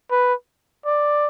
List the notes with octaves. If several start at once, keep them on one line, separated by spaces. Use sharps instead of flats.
B4
D5